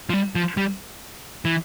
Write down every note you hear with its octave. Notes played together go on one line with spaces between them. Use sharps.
F3
G3
F3
G3
E3